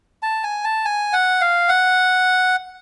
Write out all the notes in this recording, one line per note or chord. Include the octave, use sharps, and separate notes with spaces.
A5
G#5
A5
G#5
F#5
F5
F#5